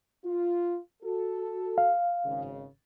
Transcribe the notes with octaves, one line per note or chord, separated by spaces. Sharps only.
F4
F#4 A4
F5
G#1 C#3